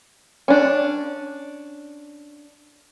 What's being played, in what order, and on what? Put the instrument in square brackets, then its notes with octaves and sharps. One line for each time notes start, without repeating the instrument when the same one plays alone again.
[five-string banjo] C#4 D4